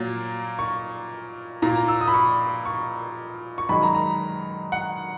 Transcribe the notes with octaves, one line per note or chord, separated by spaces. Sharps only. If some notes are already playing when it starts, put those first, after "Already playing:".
Already playing: A#2 F#3 A#3
C#6
A#2 A#3 A#5
A#5
E6
D#6
B5
C#6
C#6
C#6
F#2 D#3 G#3 B5
A#5
A#5
F#5